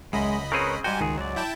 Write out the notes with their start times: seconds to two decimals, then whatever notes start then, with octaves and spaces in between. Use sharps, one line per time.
0.13 C#2 F#2 G#3 D#5 B5
0.52 C#3 C4 G#4 A#4 B4 C#5
0.84 G#2 G3 F#4 G5 G#5
1.01 C#2 D#3 G#4
1.18 F#3 D5
1.36 E4 G5 A5